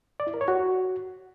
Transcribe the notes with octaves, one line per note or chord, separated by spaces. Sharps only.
D5
E4
A#4
C#5
F#4